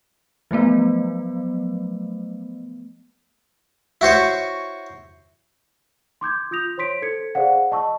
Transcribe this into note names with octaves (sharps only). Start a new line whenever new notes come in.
F3 F#3 A3 B3
E4 F#4 C5 C#5
C6 D6 G6 G#6
F4 D#6 G6 A#6 F7
C5 C#5 C6 B6 D7
A4 C5 G#6 C#7
G#4 C5 D5 F5 F#5
D#5 A5 C#6 E6